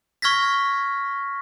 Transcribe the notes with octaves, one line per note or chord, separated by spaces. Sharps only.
C#6 F6 G#6 A#6 B6